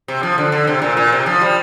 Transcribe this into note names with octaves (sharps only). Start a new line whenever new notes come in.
C3
F3
D3
D3
C3
A#2
A#2
C3
F3
G3